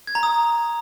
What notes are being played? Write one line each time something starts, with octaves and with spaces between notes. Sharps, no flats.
G#6
A#5
D#6